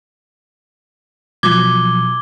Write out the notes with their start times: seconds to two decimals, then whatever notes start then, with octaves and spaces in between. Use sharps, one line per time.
1.43 B2 F3 F#3 D6 G#6 G7